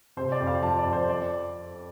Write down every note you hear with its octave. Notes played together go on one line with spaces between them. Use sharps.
C3 C5
D5
F2
F5
F3 A5
D5
F2
C5
F3 D5